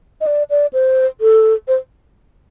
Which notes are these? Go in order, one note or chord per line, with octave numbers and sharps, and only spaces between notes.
D#5
D5
D5
C5
A4
C5